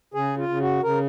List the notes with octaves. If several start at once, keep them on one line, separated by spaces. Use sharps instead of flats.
C#3 G#4
F4
C#3
F#4
C#3 A#4